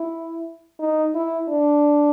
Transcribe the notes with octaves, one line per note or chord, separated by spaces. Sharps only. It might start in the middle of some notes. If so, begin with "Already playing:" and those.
Already playing: E4
D#4
E4
D4